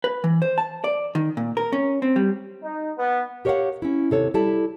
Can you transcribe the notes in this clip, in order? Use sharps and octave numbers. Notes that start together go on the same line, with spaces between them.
B4
E3
C5
A5
D5
D#3
A#2
A#4
C#4
C4
G3
D#4
B3
G4 A#4 C#5 D5 F5 F#5
C#4 E4
D#2 C3 A4 C#5
G3 E4 A4 A5